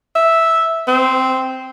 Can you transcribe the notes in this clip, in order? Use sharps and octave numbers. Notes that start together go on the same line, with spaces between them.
E5
C4